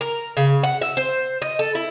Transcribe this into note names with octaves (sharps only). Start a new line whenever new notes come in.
A#4
C#3
F#5
E5
C5
D#5
A4
E4